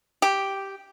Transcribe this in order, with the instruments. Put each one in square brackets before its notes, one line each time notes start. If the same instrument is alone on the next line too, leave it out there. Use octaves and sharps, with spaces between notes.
[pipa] G4